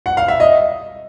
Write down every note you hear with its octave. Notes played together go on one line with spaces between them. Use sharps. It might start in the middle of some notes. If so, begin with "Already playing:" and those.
F#5
F5
E5
D#5